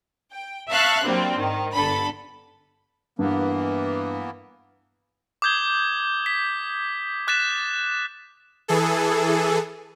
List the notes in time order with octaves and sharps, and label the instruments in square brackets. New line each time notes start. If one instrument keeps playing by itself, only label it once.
[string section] G5
E5 F5 A5 C#6 E6 F#6
F#3 G3 A#3 C4 D4
G#2 D#3
G1 D3 A4 B5
[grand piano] G2 [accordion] E3 A#3 B3
[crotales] D6 D#6 G6 G#6 G7
B6
D6 F#6 A6 B6 E7
[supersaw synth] E3 G#4 A4